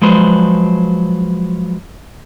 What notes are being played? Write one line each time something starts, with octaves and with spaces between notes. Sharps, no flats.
F3 F#3 G#3 B4 C5